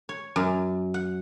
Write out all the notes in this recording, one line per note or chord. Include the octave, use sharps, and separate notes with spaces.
C#5
F#2
F#5